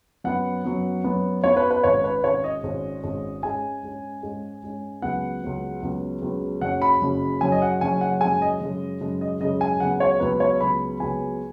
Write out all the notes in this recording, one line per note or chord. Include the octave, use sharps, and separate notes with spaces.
F#2 F#3 B3 F#5
F#2 F#3 B3
F#2 F#3 B3
F#2 F#3 B3 C#5
B4
B4
G#1 G#2 G#3 C#4 C#5
B4
G#1 G#2 G#3 C#4 C#5
D#5
G#1 G#2 G#3 C#4
G#1 G#2 G#3 C#4
G#2 G#3 C#4 G#5
G#2 G#3 C#4
G#2 G#3 C#4
G#2 G#3 C#4
C#2 C#3 F#3 B3 F#5
C#2 C#3 F#3 B3
C#2 C#3 F#3 B3
C#2 C#3 F#3 B3
F#1 F#2 C#3 F#3 C#4 F#5
B5
F#1 F#2 C#3 F#3 C#4
F#1 F#2 C#3 F#3 C#4 G#5
D#5
F#5
F#1 F#2 C#3 F#3 C#4 G#5
F#5
F#2 C#3 G#3 G#5
D#5
F#2 C#3 G#3
F#2 C#3 G#3
D#5
F#2 C#3 G#3 D#5
G#5
C#2 C#3 F#3 B3 F#5
C#5
C#2 C#3 F#3 B3 B4
C#5
C#2 C#3 F#3 B3 B5
C#2 C#3 F#3 B3 G#5